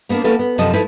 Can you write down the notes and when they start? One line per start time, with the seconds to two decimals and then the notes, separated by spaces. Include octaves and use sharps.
0.09 A#3 B3 D4 A#4
0.24 A#3 C#4 E4 A4 B4
0.39 B3
0.58 F#2 C3 F3 A4 D#5
0.73 F3 A3 D#4 E4 B4